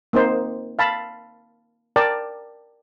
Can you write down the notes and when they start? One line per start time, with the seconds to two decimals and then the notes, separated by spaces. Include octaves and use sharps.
0.13 A#3 C4 D#4 C5
0.79 F5 A5 B5
1.96 A#4 D5 G5 A5